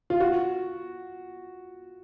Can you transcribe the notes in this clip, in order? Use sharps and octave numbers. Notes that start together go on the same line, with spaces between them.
F4
F#4